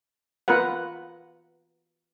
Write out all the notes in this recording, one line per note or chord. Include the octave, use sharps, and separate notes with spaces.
B3 F4 A#4 B4 F#5